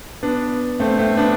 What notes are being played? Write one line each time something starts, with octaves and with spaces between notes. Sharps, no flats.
B3 D4
A3 C4
A3 C4
B3 D4